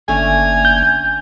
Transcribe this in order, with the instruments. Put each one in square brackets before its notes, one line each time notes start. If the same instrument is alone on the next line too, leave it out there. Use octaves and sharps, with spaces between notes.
[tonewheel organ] G1 A#3 [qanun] D3 A3 C#4 [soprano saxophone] G#5
[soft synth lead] G6